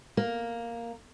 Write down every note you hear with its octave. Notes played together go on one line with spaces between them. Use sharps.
A#3